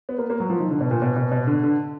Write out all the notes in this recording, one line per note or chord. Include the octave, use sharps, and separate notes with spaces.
B3
A#3
A#3
F#3
F3
D#3
D3
B2
A#2
B2
B2
B2
D3
D3